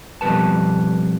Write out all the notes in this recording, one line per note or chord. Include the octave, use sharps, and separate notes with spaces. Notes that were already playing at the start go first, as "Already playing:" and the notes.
F2 B2 G3 B4 A5